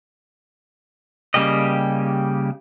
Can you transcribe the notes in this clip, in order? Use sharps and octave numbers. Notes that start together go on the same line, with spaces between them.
C#3 G3 A#3 G4 D#5